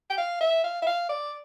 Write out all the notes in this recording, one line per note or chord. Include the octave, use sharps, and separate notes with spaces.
G5
F5
E5
F5
E5
F5
D5